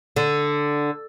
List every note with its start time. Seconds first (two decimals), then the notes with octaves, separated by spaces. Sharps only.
0.16 D3